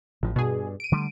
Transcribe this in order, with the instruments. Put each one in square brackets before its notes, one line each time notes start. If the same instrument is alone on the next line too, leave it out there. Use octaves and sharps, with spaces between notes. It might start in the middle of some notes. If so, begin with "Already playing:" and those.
[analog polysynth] A1 [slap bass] A2 F3
[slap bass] G2 [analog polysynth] B2 G#4
[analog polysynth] D7 D#7
[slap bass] D3 G3 A3